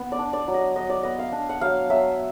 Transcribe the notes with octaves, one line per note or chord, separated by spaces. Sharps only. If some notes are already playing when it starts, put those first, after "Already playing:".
Already playing: B3
D5
D4
D5
F#3
D#5
F#3 D#5
D5
B3 D#5
F5
D4
F#5
F#3 F5
F#3 E5